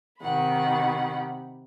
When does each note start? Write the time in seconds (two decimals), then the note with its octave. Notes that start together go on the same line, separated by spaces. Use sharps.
0.20 C3 D#3 F#5 B5